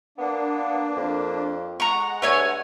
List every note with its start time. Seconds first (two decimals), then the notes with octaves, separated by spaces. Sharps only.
0.18 A#3 B3 D4
0.97 F2
1.80 G#3 F#5 A#5 C#6
2.22 G2 A3 C#5 G#5